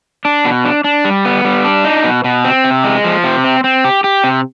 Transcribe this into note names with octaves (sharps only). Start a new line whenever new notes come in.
D4
B2
D4
D4
G3
B3
G3
D4
D#4
B2
B2
C4
C3
G#3
F3
C3
C4
C4
G4
G4
C3